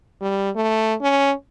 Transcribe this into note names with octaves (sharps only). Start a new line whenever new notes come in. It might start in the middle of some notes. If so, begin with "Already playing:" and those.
G3
A3
C#4